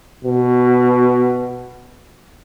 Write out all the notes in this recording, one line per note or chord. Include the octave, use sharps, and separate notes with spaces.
B2